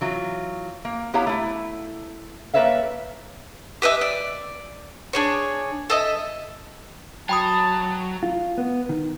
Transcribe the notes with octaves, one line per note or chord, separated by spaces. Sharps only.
E3 F#3 F4
A#3
B3 E4 G4 C#5 F5 A#5
A3 E4
A#3 A4 B4 C#5 E5 F5
G4 B4 D#5 E5
D5
D4 G#4 C#5
A4 D#5 E5
F#3 G5 A5 B5 D#6
F4
B3
D#3